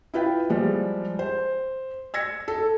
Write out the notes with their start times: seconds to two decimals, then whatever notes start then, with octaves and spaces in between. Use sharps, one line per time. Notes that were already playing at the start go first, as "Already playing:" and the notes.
0.14 E4 F4 B4 G5
0.50 F3 G3 G#3
1.19 C5
2.14 E6 G#6 A#6 C#7
2.48 A4